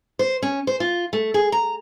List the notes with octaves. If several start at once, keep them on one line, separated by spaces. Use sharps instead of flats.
C5
C#4
C5
F4
A3
G#4
A#5